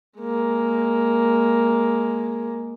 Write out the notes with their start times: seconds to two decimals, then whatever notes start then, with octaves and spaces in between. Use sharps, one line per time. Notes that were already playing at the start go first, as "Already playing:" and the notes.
0.19 G#3 A#3